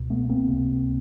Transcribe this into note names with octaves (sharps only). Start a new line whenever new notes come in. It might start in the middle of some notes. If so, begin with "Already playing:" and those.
Already playing: C#2 B2
A3 B3
A#3 C4
C#2 C3